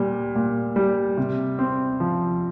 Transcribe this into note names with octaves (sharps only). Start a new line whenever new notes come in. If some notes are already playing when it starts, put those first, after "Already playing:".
Already playing: A#2 G3
A#2
G3
C3
C4
F3